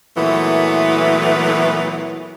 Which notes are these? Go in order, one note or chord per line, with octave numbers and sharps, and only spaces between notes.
A#2 E3 F#3 A3 B3